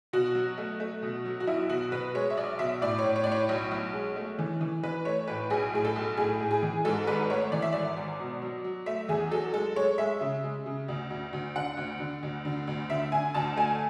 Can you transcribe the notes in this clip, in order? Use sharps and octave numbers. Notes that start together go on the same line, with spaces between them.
B2 F#4
F#3
A3
A3
B2
F#3
F#4
B1 E4
B2 F#4
B2 B4
G#3 C#5
E5
B1 D5
B2 E5
A2 D5
C#5
A2
C#5
A2 D5
C#5
B1
B1
G#3
A3
E3
E3
E3 B4
A3 C#5
A2 B4
B1 G#4
A2 G#4
A4
B1
A2 G#4
A2
G#4
E3
G#2 A4
G#1 B4
A3 C#5
E3 D5
E5
G#1 D5
G#1
B2
F#3
F#3
A3 E5
E2 G#4
F#3 A4
G#3 A4
G#3 C#5
G#3 E5
C#3
G#3
C#3
D2
D2
D2
D3 F#5
D2
D3
D2
D3
D2
D3 E5
D3 G#5
D2 A5
A3 G#5